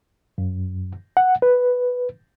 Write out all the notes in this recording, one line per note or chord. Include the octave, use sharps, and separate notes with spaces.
F#2
F#5
B4